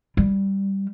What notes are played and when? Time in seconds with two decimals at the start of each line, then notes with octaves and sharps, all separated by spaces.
0.17 G3